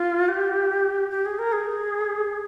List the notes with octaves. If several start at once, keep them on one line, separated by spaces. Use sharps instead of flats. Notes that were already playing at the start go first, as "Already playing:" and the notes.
Already playing: F4
G4
G4
G#4
A#4
G#4